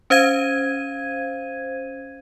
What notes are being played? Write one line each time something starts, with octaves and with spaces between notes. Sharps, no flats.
C#4 C5 F5 G#6 D#7